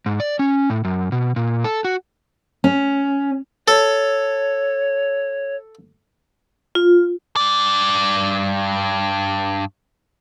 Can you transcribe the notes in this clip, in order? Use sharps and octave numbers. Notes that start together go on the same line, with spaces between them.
G#2
D5
C#4
A2
F#2
B2
A#2
A4
F#4
C#4
A4 C#5
F4
G2 D5